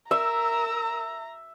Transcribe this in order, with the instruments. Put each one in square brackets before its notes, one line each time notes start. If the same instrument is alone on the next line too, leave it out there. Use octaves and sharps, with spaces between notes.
[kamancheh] A#4 E6 [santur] E5 [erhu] A#5